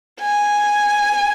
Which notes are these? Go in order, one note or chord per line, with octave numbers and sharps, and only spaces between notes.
G#5